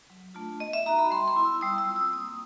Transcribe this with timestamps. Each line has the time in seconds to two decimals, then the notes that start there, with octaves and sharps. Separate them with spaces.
0.10 F#3
0.34 A3 D4 F4
0.60 B3 D#5
0.73 E5
0.86 D#4 F#4 A#5
0.99 B5
1.11 G3 C6
1.28 C6
1.36 B3 E4
1.45 E6
1.61 G3 D#6
1.78 E6
1.87 C4 F4
1.96 D#6
2.13 A#3 D#6